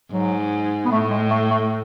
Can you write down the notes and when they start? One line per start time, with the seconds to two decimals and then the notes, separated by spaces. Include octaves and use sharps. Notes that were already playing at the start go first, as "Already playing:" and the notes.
0.12 G#2 F#3
0.85 B3
0.91 A2 A3
1.10 G#3
1.31 A3
1.50 A3